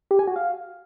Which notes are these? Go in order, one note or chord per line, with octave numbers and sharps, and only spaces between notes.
G4
G#5
F#4
F5